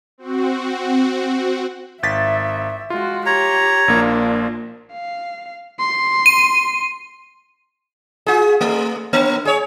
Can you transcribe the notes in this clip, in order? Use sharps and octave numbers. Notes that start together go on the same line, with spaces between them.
C4 F#4
G#1 E5 A6 B6
G#3 F4 F#4
G4 C#5 A#5
A#1 A#3 D4 F4
F5
C6
D#7
F4 G#4
A3
A#3
G#4 C#5